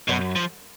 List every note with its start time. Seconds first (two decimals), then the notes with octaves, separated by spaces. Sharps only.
0.08 F#2 B2
0.36 F3